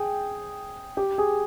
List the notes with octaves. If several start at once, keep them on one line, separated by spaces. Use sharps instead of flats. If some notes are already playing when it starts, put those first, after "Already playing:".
Already playing: G#4 G5
G4 G5
G#4